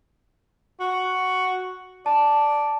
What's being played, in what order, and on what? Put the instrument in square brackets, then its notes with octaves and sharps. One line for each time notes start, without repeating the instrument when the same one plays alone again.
[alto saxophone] F#4
[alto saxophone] D5 [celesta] A5